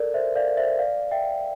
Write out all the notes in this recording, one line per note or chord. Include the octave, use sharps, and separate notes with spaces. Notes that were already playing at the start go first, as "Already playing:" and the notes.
Already playing: A4 A#4 D5
C5 E5
D5 F5
C5 E5
D5 F5
E5 G5